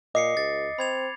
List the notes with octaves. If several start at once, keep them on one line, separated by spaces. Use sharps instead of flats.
A#2 D#5 D6 C7 C#7
C#2 A6
C4 B5 G#6 F7